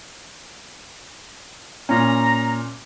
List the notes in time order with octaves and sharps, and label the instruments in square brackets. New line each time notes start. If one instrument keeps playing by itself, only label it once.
[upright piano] A#2 C#4 [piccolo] A#5